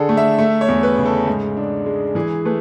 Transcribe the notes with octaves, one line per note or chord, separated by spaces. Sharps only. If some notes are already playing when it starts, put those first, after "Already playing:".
Already playing: D3 D4 G#4 A4
A3
E5
A3 E5
C#5
E2
B4
C#3
A4
G#2
D4
G#3
E3 G#4
A3 B4